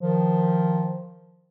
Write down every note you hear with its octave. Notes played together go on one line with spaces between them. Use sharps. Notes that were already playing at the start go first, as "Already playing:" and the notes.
D#3 F3